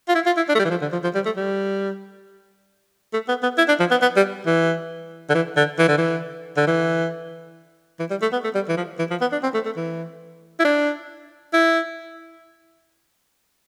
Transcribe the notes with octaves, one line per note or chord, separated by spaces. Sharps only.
F4
E4
F4
E4
D4
A3
G3
E3
F3
D3
F3
F3
G3
A3
G3
A3
B3
B3
E4
D4
F3
B3
B3
G3
E3
D3
E3
D3
E3
D3
E3
D3
E3
E3
G3
A3
B3
A3
G3
E3
F3
E3
F3
B3
D4
C4
A3
A3
E3
E4
D4
E4